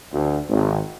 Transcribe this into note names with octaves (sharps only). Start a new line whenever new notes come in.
D2
G#1